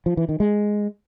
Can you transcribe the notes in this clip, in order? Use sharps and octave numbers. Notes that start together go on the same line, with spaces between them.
F3
E3
D#3
G#3